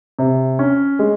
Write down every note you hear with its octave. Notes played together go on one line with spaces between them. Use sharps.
C3
C#4
G#3